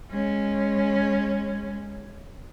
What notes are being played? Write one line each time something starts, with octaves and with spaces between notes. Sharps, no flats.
G#3 C#4